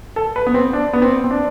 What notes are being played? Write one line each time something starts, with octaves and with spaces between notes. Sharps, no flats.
A4
B4
B3
C4
D4
B3
C4
C4
D4